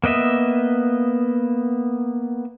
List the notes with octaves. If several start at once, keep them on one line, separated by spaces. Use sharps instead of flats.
A#3 B3 D#5 E5